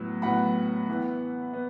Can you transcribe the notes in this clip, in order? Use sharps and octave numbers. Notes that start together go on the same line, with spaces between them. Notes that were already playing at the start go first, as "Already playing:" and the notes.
Already playing: A2 F#3 B3
A2 F#3 B3 F#5 B5
E3 B3
B3